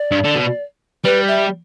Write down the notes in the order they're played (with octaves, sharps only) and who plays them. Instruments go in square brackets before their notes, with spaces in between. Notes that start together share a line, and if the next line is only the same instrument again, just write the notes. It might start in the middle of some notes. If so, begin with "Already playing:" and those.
Already playing: [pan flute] D5
[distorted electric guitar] G2
D3
B2
[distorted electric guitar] G3 [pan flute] B4
[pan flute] E5